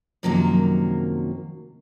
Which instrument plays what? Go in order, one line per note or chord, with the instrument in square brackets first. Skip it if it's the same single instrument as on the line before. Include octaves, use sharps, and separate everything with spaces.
[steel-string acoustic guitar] F#2 C3 D#3 F3 F#3 A#3